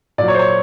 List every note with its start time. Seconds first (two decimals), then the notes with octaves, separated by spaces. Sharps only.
0.18 A#2 F#3 D5
0.28 C#5
0.34 C5
0.39 C#5